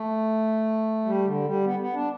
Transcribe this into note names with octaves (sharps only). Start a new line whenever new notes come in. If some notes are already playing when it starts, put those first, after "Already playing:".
Already playing: A3
G3
D3
G3
B3
B3
D4